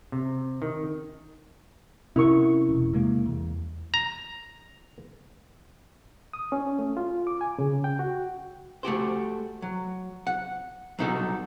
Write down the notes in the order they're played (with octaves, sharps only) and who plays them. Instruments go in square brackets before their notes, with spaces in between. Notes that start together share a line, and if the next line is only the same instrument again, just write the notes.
[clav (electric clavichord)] C3
D#3
[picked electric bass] C3 C#4 [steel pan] E4 A#4 C#6
[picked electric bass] E1
C3 G#3 A#3
E2
[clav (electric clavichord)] A#5
[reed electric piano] D#6
C#4
A3
F4
D6
G#5
C#3
G5
F#4
[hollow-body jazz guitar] A3 F#4 G4 C5
F#3
F#5
F#3 G3 D#4 F#4 A4